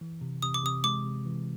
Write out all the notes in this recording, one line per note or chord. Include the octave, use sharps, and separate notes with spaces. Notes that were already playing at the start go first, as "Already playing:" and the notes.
E3
C3
C3 D#6
D6
C3 D#6
G#3 D6
C3
E3